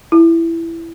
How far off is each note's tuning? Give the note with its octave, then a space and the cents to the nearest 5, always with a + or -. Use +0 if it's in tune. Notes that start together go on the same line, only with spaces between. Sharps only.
E4 +10